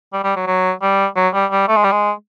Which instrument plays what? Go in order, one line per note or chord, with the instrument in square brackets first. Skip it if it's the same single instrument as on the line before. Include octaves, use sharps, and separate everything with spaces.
[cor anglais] G3
G3
F#3
F#3
G3
F#3
G3
G3
A3
G#3
G3
G#3